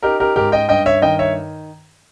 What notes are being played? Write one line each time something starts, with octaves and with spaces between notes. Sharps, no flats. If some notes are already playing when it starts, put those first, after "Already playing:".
D#4 G4 A#4
G4 A#4
G#2 G4 A#4
D#5 G5
G2 D#5 G5
C#5 E5
D#3 D#5 G5
C#5 E5